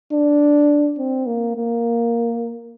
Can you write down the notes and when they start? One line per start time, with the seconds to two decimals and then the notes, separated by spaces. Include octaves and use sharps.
0.12 D4
0.98 C4
1.26 A#3
1.56 A#3